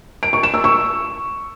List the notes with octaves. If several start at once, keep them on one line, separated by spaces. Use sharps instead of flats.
D7
C#6
E7
E6
C#6